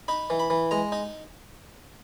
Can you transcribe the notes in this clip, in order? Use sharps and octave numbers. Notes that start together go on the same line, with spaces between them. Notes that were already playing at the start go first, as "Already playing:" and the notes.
D#4 B5
E3
B5
E3
G#3 A#5
D#4